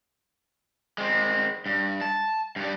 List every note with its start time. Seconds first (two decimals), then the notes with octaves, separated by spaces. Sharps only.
0.98 G#3 C4
1.66 G2
2.01 A5
2.56 G2 G3